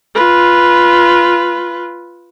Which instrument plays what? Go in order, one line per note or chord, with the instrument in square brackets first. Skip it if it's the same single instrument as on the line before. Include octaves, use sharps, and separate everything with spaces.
[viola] F4 B4